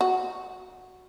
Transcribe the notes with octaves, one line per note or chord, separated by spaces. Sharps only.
F#4